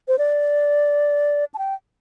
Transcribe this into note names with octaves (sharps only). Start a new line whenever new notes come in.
C5
D5
A5
G5